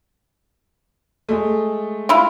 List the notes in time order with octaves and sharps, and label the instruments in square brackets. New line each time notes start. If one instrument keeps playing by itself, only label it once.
[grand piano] G#3 A3
[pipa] E4 F4